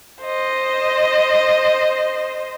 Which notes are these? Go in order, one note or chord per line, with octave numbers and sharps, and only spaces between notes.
C5 D#5